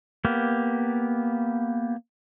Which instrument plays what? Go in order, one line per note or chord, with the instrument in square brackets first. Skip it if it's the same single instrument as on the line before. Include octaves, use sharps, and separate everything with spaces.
[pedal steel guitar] A#3 B3 G4